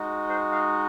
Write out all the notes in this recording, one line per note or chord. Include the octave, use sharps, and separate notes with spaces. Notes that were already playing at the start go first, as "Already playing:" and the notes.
Already playing: G#3 D#4 F#4
C5
F5